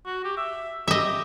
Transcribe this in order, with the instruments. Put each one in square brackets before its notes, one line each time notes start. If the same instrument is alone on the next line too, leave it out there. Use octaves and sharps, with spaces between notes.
[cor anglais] F#4
G4
E5
[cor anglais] G4 [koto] D#5 E5